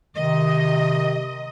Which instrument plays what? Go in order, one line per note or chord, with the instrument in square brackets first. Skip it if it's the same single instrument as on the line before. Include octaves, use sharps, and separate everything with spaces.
[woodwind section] C3 D#3 [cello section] D#5